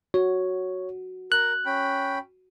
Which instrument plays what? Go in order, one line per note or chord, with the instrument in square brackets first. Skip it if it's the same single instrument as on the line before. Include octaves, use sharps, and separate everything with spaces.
[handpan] F#4 [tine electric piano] C#5
[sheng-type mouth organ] A#4 [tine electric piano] F#6
[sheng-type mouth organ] C#4 G5 B5